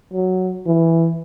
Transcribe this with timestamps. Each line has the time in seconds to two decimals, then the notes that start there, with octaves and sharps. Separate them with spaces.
0.14 F#3
0.67 E3